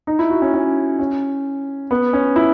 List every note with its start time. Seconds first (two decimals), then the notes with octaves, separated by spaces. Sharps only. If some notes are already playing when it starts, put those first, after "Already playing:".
0.07 D#4
0.19 E4
0.30 F#4
0.42 C#4
0.54 C#4
0.99 C#4
1.91 B3
2.13 C#4
2.36 E4